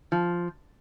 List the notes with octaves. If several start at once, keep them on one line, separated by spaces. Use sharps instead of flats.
F3